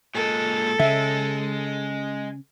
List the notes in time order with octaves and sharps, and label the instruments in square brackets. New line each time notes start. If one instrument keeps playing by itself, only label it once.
[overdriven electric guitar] A#2 G#3 [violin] A4
[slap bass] C#3 [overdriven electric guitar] G#3 [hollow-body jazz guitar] E5